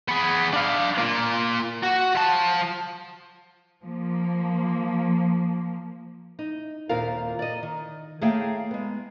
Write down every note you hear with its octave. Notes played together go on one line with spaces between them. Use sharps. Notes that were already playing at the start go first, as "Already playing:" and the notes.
B3 G#4
D4 F5
A#3 F4
F#4
F3 A5
F3 A#3
D#4
D#2 A#2 C4 F4 A#4 F5
D5 D#5
D#3
A3 A#3 G#4 C#5 F5 G5
G#3 B3